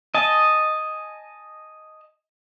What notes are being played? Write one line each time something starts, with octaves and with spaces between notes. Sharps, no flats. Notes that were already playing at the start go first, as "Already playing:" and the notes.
D#5 G#5 A5